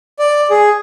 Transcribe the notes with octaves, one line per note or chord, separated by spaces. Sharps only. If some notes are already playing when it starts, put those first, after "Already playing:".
D5
G#4